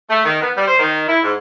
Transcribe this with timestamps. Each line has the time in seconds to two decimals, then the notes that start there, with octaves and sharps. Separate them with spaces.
0.09 A3
0.25 D#3
0.42 B3
0.56 G3
0.68 C5
0.79 D#3
1.08 E4
1.24 G#2